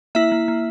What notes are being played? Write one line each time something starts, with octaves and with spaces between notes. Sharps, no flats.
A#3 E4 E5
A#3
A#3